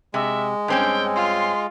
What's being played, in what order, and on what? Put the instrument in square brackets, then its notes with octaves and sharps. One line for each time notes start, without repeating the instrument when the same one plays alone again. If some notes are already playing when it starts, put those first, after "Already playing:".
[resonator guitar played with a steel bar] C3 [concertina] G#3 [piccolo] E5
[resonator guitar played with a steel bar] G2 C4 C#4 [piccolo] G5
[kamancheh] F4 [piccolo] C6